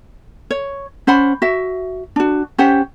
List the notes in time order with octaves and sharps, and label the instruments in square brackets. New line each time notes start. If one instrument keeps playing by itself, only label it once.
[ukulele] C#5
C#4 C5 F#5 B5
F#4 E5
D4 F#4
C#4 G4 C5 F#5